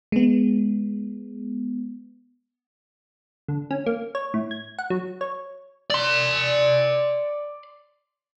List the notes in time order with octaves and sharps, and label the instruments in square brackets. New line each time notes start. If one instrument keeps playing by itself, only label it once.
[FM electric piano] G#3 B3
[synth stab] D3
C#4
A#3
C#5
A2
G#6
F#5
F#3
C#5
[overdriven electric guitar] D5 C6